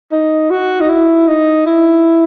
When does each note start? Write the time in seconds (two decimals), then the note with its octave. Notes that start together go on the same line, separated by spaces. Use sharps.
0.12 D#4
0.50 F#4
0.80 D#4
0.89 E4
1.28 D#4
1.66 E4